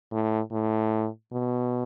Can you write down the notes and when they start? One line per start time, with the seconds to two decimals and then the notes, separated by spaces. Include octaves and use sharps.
0.12 A2
0.52 A2
1.32 B2